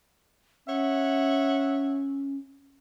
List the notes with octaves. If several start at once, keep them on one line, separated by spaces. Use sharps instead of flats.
C#4 C#5 E5 F#5